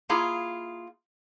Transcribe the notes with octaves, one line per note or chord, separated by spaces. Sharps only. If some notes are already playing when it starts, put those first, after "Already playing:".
A#3 E4 F4 G#4 A#5